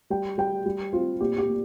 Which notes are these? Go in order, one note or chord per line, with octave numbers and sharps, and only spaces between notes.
G3 G5
G3 G5
G3
C4 F4
A#2 G4
G4
A#3